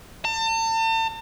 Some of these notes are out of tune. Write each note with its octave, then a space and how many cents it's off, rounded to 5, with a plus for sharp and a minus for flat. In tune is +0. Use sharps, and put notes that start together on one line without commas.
A5 +40